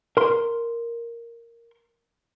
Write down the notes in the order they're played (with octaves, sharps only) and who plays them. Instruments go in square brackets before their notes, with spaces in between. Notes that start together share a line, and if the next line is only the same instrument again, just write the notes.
[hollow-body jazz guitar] A#4 C6